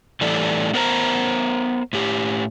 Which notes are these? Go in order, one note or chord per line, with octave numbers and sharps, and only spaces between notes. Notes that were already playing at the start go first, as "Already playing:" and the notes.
A2 E3 G3 A4 D5
B3 A#4 C5 A#5
A2 G4